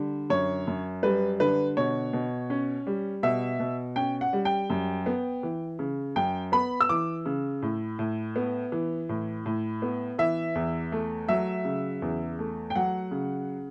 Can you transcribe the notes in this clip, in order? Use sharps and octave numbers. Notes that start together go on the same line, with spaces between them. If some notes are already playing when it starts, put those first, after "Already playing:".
Already playing: D3 G3
F#2 C#5
F#2
G3 B4
D3 B4
B2 C#5
B2
C#4
G3
B2 E5
B2
C#4 G5
F#5
G3
G5
F#2
B3
E3
C#3
F#2 G5
B3 B5
E6
E3 D6
C#3
A2
A2
B3
E3
A2
A2
B3
E3 E5
E2
A3
F#3 E5
C#3
E2
A3
G5
F#3 F#5
C#3